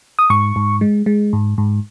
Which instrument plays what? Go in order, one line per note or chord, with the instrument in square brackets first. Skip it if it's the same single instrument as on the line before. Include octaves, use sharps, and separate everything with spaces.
[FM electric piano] D#6
G#2 C#6
G#2
G#3
G#3
G#2
G#2